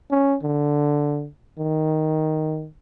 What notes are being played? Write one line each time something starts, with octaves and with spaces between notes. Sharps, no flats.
C#4
D3
D#3